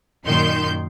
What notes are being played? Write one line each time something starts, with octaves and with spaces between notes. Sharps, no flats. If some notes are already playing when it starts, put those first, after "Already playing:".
F#2 A#2 D#3 C6 G6